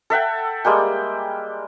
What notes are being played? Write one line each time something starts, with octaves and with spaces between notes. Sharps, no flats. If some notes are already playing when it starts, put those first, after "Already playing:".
A4 E5 F#5 G5
G3 G#3 A#3 G5